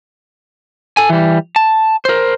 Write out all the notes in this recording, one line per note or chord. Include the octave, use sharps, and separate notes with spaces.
A4 G#5
E3 G3
A5
A#4 C5